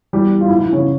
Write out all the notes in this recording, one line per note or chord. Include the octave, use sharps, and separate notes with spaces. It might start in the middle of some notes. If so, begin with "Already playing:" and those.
E2 E3 G3 G4
F4
G#2 E3 F3 E4
E3 E4
C#3 C#4